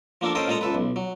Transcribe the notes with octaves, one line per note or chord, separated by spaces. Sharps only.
F3 A#3 D4 A4 A#4
C#4 A4 A#4 C5 D#5 G5
A#2 G#3 A4 D#5 A#5
C#2 A4 B4
B1
F#3